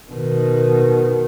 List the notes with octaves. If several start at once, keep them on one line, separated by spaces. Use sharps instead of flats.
B2 D#3